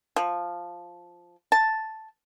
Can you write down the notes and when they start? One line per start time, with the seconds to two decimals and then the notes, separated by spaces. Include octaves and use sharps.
0.16 F3
1.52 A5